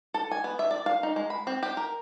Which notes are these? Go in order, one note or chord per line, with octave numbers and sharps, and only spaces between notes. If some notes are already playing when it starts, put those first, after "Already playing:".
A4
G#5
B3
E5
D5
F5
D#4
G#3
B5
C4
G4
A#4